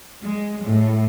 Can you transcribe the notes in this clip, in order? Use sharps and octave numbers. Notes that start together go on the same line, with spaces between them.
G#3
A2